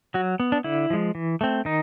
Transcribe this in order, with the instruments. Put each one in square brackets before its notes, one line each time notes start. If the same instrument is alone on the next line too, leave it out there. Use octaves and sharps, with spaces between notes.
[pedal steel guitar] F#3 F#4
B3
D4
D3 E4
F3 G#3
E3
A3 C4
D#3 D#4